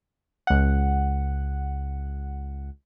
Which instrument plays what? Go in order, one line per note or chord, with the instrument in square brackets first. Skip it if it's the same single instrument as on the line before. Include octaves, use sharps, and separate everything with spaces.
[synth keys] C#2 F#5